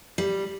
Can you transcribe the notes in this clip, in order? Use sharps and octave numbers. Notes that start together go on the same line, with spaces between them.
G3